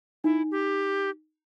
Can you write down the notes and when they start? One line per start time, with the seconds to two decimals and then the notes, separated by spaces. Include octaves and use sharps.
0.24 D#4 E4
0.51 G4